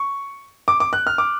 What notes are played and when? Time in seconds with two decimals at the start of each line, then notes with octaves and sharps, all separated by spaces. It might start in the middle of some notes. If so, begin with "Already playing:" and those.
Already playing: C#6
0.68 D6
0.80 D6
0.93 F#6
1.07 F6
1.18 D6